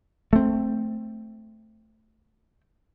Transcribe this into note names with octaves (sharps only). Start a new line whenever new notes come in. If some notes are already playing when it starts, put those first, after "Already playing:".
A3 C4